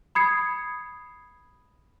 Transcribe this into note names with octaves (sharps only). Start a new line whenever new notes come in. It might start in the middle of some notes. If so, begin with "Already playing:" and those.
B5 D#6 G#6 C7 C#7